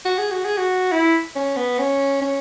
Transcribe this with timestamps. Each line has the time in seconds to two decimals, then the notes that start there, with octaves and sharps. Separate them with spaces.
0.05 F#4
0.19 G#4
0.32 F#4
0.45 G#4
0.58 F#4
0.92 E4
1.36 C#4
1.57 B3
1.79 C#4
2.22 C#4